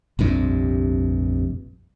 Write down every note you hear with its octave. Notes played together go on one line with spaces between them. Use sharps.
F1 A#1 G2 C3